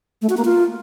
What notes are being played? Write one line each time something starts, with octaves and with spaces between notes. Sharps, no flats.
A3
F#4
A#3
F4